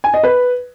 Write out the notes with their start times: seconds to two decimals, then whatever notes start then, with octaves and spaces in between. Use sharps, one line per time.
0.04 G#5
0.14 D#5
0.23 B4